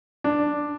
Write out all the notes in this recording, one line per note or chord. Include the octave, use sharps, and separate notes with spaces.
D4